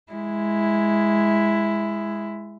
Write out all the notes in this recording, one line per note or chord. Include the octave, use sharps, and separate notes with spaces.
G#3 E4